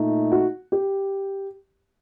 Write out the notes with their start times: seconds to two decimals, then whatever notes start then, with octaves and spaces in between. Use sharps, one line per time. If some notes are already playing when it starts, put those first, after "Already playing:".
Already playing: A#2 A3 D#4
0.32 F#4
0.72 G4